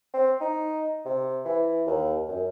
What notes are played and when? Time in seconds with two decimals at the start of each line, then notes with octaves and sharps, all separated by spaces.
0.14 C4
0.41 D#4
1.05 C3
1.45 E3
1.87 D#2
2.28 F#2